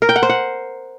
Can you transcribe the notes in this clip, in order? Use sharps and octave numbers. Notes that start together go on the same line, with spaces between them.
A#4
G5
F#5
C5
F#5